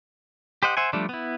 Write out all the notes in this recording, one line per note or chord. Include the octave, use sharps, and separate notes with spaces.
G4 C5 D#5 F#5
C5 E5 F#5 G#5
F3 G3 A3 D4
B3 E4